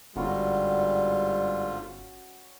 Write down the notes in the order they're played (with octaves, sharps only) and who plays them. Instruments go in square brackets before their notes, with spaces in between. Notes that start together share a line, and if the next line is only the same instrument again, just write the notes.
[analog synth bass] G1 [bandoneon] G#2 D3 F4 [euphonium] G3 [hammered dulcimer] C#4 F#4 B5